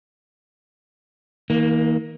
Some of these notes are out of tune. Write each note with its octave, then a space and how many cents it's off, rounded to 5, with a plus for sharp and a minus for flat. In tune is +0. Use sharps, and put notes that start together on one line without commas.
D#3 +45 A#3 +0